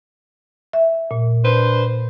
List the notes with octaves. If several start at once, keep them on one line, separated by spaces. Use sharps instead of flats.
E5
A#2
D4 B4 C5